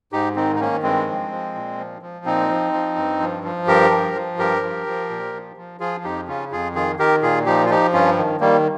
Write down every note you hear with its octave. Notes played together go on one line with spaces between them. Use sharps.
G#2 D#4 G4
D#3 C4 D#4
D#4
D#3 A#3 C#4
G2 G#3 C4
F3
F3
A#2
F3
F3
A#2 C4 D#4
F3
F3
G2
F3
F3
G2 G4 A#4
F3
F3
G2 G4 A#4
F3
F3
A#2
F3
F3
F3 F4 G#4
F2 D#4 G4
C#3 C#4 F4
F2 F4 G#4
D#3 F4 G#4
D#3 G4 A#4
A#2 F4 G#4
F3 D#4 G4
F4
F3 D#4 G4
G2 C#4 F4
D#3
D#3 G3 A#3